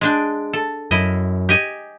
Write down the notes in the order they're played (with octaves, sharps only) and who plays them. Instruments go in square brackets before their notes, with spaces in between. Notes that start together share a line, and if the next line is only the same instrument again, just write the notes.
[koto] G#3 D4 G5
A4
[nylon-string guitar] F#2 [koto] E4 D#5
[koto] G4 D#5 G#5